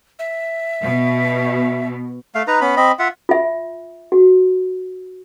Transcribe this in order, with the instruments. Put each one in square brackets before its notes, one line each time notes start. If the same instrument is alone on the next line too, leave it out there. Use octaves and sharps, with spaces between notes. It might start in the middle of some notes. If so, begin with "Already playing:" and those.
[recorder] E5
[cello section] B2
[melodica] A3 F5
D#4 B4 A#5
B3 C#4 B5
C4 D#5 B5
F4 E5 F#5
[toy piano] F4 E5
F#4